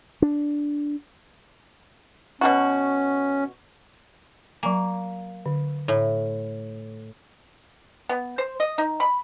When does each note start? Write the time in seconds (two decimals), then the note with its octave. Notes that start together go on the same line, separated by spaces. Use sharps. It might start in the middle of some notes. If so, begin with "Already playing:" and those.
0.22 D4
2.41 B2 D#3 C#4 F#4
4.63 F#3 A#3 G#5
5.46 D3
5.88 A2
8.09 B3
8.38 C5
8.60 D#5
8.78 D#4
9.00 B5